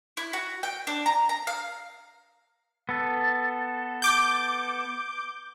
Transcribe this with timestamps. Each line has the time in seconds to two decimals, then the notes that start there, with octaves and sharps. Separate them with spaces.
0.17 E4
0.33 F#4
0.63 G5
0.87 D4
1.06 A#5
1.29 A#5
1.47 F5
2.89 B3 A4
4.02 D6 G6